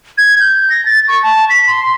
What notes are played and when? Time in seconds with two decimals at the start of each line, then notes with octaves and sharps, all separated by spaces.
0.18 G#6
0.40 G6
0.70 A#6
0.86 A6
1.08 C#6
1.23 A5
1.50 B6
1.67 C6